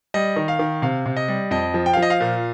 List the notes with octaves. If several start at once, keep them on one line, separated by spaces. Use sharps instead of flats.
G3 D#5
D#3
F5
D#3
C3 F5
C3
D#5
G3
F2 D#5
F3
G5
F5
F3
D#5
F5
A#2